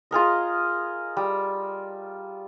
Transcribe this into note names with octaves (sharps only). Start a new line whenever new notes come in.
F4 G#4 A#4 D#5
G3